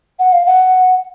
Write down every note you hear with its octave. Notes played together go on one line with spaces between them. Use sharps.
F#5
F5
F#5